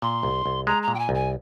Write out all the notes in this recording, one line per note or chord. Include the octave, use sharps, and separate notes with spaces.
A#2 C6
C2
C2
G#3 A#5
A#5
A#2
G5
G#5
C2
G#5